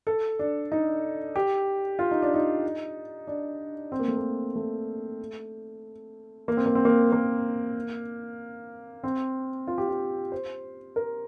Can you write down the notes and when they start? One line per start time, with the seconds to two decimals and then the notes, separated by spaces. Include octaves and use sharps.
0.07 A4
0.39 D4
0.72 D#4
1.36 G4
1.99 F4
2.11 D#4
2.22 D4
2.34 D#4
3.27 D4
3.92 C4
3.99 A#3
4.08 A3
4.17 A#3
4.55 A3
6.48 A#3
6.57 C4
6.66 A#3
6.75 C4
6.85 A#3
7.12 A#3
9.04 C4
9.67 F4
9.78 G4
9.88 F4
10.32 C5
10.96 A#4